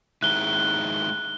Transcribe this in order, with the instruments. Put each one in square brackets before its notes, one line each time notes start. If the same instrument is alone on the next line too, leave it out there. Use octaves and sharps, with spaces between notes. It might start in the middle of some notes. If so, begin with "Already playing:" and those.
[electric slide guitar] D#3 G#3 E4 [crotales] F#6 G7